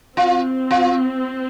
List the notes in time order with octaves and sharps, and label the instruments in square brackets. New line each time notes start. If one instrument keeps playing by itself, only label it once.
[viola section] C4 [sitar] F4
[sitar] F4